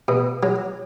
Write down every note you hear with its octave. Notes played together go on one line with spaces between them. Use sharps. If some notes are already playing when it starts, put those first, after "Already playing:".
B2
F#3